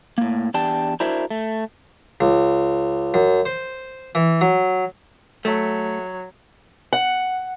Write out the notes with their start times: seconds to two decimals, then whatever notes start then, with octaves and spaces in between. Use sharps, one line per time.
0.18 A2 A#3
0.54 E2 D4 G4 A5
1.00 D4 E4 F#4 A#4 C5 E5
1.30 A3
2.21 C#2
3.14 F#2
3.45 C5
4.15 E3
4.41 F#3
5.45 F#3 A3
6.93 F#5